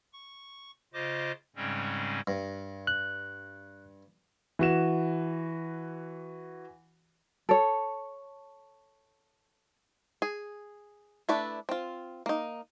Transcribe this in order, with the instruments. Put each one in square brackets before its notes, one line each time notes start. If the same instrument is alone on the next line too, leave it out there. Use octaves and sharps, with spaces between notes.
[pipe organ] C#6
C#3 F4 C5 D#5 D6
G#2 C#3 G3 G#3 C4 C#4
[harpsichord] G2
[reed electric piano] F#6
[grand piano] E3 F#4 E7
[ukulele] A4 C#5
[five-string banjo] G#4
A3 D4 E4 B4 D5
C4 F4
A#3 D#4